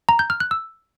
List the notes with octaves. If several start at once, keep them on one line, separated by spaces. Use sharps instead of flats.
A#5
G6
F6
F#6
E6